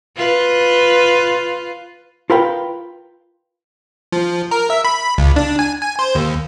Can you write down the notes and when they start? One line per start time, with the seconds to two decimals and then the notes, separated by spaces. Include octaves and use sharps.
0.16 F4 B4
2.30 F4 A#4 B4 F5 G5
4.12 F3
4.51 A#4
4.70 E5
4.84 B5
5.18 C#2
5.36 D4
5.59 G#5
5.82 G#5
5.99 C5
6.15 D#2